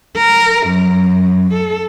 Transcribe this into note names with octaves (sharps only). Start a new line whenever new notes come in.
A#4
F#2
A4